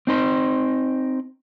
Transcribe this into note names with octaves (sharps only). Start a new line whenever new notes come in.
C4 D#4 C5